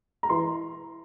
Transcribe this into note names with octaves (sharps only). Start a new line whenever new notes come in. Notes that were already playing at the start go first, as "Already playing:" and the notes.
A#5
E3 C6